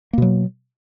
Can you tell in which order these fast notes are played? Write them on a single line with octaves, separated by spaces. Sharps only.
A#3 B2 F#3